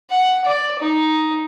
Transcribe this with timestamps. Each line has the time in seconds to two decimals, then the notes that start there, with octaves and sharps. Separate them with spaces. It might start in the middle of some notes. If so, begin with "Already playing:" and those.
0.11 F#5
0.45 D5
0.79 D#4